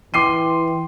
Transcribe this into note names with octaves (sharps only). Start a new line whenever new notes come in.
E3 G5 C6 D6 C7 D#7